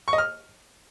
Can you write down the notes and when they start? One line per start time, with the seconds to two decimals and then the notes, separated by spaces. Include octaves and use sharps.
0.08 C#6
0.13 D#5
0.18 F6